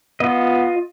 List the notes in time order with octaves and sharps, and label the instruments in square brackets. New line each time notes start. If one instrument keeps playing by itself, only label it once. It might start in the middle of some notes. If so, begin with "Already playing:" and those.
[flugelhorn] B3 [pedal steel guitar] F4 D#5